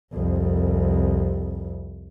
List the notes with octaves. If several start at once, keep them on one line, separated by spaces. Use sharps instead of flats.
C2 F2